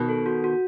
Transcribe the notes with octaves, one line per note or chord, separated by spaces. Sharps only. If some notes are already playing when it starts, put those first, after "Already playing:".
Already playing: B2 D#3
A4
F#4
F#4